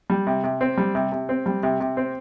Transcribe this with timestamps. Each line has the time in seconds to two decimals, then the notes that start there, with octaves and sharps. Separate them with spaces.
0.10 G3
0.27 C3
0.44 C3
0.61 C4
0.77 G3
0.95 C3
1.12 C3
1.29 C4
1.46 G3
1.63 C3
1.80 C3
1.97 C4